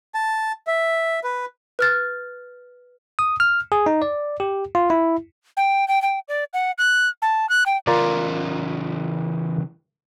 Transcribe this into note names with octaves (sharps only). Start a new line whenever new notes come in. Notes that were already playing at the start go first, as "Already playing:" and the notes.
A5
E5
B4
B4 F6 A6
D#6
F6
G#4
D#4
D5
G4
F4
E4
G5
G5
G5
D5
F#5
F#6
A5
F#6
G5
C#3 E3 F4 A#4 D5